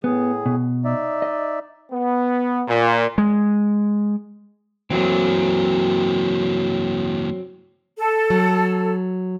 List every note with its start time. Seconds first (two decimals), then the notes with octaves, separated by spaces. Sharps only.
0.04 A2 B3 G#4
0.46 B2
0.85 D#4 D5 E5
1.22 D#5
1.92 B3
2.68 A#2
3.18 G#3
4.90 E3 F#3 A#3 C4
7.98 A4
8.30 F#3